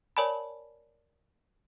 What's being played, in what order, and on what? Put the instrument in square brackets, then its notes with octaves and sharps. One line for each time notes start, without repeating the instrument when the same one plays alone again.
[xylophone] A#4 C#5 D5 G#5 A5 B5